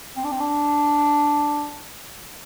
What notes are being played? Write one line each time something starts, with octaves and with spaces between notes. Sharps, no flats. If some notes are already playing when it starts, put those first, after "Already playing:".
C4
D4
C4
D4